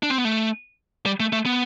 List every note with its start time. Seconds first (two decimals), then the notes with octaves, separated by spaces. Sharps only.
0.03 D4
0.10 C4
0.18 B3
0.25 A3
1.06 G3
1.20 A3
1.33 A3
1.46 B3